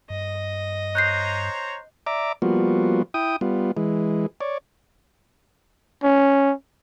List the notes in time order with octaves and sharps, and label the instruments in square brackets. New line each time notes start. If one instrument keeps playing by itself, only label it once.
[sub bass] G2 [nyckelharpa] D#5
[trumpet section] C5 C#5 A#5 [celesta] F#6 G6 C7
[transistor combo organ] D5 E5 A#5 D6
F3 G3 A#3 B3 F4 F#4
E4 G5 D#6
G3 B3 F4
E3 G#3
C#5 D5
[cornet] C#4